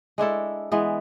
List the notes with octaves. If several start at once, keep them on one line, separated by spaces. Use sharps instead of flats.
G#3 D4 E4 A4
E3 G#3 B3